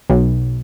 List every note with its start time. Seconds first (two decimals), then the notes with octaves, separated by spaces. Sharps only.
0.10 B1